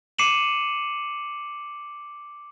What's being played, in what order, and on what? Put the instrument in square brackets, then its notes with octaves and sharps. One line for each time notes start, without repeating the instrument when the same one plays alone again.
[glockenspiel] D6 C7 C#7 D#7 E7 F#7